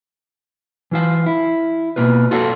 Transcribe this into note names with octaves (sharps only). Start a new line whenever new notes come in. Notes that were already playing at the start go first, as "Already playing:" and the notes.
E3 F4 F5
E4
B2 A#3 F4 B4
F4 F#4 A4 D5 F5